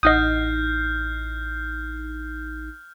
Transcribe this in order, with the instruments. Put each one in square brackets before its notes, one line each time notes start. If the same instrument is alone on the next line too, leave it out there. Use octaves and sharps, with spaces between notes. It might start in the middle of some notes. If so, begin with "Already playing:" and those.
[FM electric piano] A1 D#4 C7 [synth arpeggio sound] D#5 F#5 D#6 [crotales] F6 G6